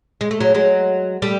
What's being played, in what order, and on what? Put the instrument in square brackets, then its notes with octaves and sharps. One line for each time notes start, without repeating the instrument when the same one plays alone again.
[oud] G#3
A3
F#3 G#3
F#3 G#3
G3 A3